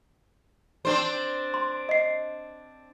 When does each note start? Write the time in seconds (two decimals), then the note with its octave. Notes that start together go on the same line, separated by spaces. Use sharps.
0.85 C4 D4 C5
1.54 C6
1.89 D#5 C7